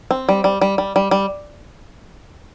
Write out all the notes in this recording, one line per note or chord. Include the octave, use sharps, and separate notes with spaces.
C4
G3
G3
G3
G3
G3
G3